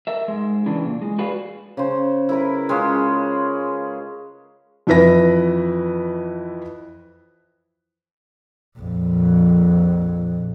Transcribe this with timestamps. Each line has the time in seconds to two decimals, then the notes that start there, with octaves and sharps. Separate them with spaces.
0.07 A#4 E5
0.28 G#2 G#3
0.66 C#3 E3 D4
0.84 A#2
1.02 G#3
1.19 F#4 G#4 B4 D5 F5
1.77 C#3 C5
2.29 E4 A#4 B4
2.69 G#3 C#4 F4
4.87 F2 E3 E4 B4 A#6
8.79 A#1 F2